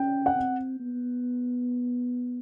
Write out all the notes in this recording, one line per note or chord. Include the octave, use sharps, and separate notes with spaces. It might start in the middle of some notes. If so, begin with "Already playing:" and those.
Already playing: C#4 G5
F#5
C4
B3